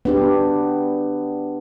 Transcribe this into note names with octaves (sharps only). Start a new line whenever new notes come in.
B3 D4 G4